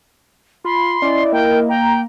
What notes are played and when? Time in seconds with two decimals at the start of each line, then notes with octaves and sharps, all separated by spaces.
0.65 F4 B5 C6
1.02 C#4 E4 D5 D#5
1.32 A#3 A#4 G5
1.69 G5 A#5